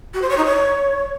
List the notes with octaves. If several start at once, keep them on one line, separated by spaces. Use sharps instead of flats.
F#4
C5
C#5
D#4
C#5